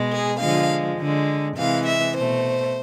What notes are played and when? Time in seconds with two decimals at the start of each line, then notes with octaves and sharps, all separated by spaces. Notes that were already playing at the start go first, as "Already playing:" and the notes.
Already playing: B2 G#3
0.12 G#4
0.40 D3 F3 G#3 F5
0.99 D3 G#3
1.58 C3 E3 G#3 F5
1.87 E5
2.16 B2 A3 C5